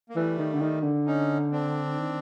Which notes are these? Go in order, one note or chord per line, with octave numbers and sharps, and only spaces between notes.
A#3
E3 G3 A3
D#3
D3
D#3
D3
C#4 D#4
C4 D4
D#3